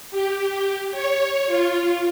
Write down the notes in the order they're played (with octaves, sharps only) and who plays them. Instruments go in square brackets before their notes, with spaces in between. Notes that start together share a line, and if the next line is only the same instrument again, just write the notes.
[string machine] G4
C#5
F4